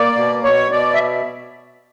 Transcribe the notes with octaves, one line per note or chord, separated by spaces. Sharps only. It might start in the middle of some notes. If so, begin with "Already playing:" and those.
Already playing: A#3 D5
B2
B2 C#5
B2 D5
E5